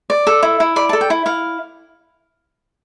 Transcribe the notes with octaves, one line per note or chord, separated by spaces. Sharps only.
D5
A4
E4
E4
D5 B5
A5
A4
G5
E4
E4 F5